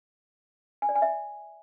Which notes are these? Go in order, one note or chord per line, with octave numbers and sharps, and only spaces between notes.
G#5
D5
G#5
E5